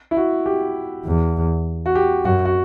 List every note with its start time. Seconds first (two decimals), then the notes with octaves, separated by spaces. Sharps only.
0.11 E4
0.17 F#4
0.46 G4
1.05 E2
1.86 F#4
1.95 G4
2.25 F#2 F#4
2.45 F#4